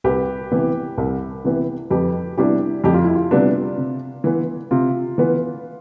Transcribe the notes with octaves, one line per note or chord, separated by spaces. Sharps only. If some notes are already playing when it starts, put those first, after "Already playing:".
C2 G4 B4
C3 E3 B3 E4
C2
C3 E3 B3 E4
F2 G4 B4
C3 G3 B3 D4 E4 G4
F2 G4
F4
E4
F4
C3 G3 B3 D4
C3
E3 B3
C3 F4
E3 B3